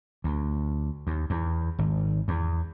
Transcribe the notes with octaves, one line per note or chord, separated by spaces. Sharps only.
D2
D#2
E2
G#1
E2